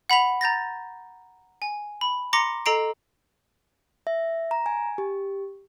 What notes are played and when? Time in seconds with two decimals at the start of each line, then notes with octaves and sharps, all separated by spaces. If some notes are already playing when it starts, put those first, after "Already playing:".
0.10 F#5 B5 B6 F7
0.41 A#5 G6 A6 A#6
1.62 G#5
2.01 B5
2.33 A#5 C6 D6 A#6 C#7
2.66 A4 D#5 A#5 C7 D7
4.07 E5
4.51 A#5
4.66 G#5
4.98 G4